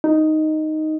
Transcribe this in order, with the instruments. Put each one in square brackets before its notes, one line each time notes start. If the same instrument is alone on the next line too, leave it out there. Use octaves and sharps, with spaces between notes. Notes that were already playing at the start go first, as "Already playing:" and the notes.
[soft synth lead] D#4